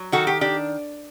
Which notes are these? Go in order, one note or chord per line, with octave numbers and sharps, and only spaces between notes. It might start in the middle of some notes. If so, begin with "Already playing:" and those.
Already playing: F#3
D#3 F#4 A4
G4
D4 G4